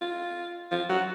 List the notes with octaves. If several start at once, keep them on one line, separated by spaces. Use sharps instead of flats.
F4
F4
F#4